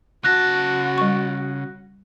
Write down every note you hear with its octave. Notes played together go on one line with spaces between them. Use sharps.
C#3 F#4 A5 F#6 A#6
G3 C#6